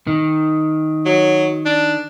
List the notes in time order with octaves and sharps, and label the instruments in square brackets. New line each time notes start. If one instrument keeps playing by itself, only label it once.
[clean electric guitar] D#3
[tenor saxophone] F#3
D4